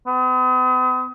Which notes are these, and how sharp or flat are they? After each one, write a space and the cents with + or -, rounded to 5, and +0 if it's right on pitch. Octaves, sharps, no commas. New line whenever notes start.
B3 +45